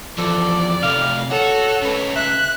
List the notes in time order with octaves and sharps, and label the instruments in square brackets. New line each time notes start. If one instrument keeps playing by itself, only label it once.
[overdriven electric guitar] E2 F3 [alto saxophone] A4 [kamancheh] D5
[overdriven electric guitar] C3 A3 [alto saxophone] F5
[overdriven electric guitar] F#4 [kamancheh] A4 [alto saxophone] C#5
[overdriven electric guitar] C#3 B4
[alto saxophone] E5 [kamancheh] F#6